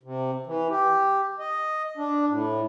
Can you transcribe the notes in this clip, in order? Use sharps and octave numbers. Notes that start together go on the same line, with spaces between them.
C3
E3
G4
D#5
D4
A2